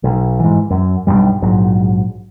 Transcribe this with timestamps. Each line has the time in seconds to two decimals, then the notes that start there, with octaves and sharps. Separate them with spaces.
0.04 B1
0.40 G#2 E3
0.70 F#2
1.07 B1 E2 G2 G3
1.42 A#1 G#2 F#3